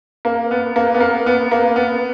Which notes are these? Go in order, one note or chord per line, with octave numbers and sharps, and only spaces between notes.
A#3
B3
A#3
B3
A#3
B3
A#3
B3